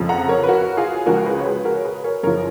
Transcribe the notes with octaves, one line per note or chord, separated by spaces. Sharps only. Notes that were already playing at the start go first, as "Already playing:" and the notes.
Already playing: F2 C#3 F3
F#5 A#5
A#4 C#5
B4
F#4 A#4
F4 G#4
C#2 C#3 F3 F#4 A#4
G#4 B4
C#5
G#4 B4
F#4 A#4
C#5
G#4 B4
A#4 C#5
F#2 C#3 F3 A#4 C#5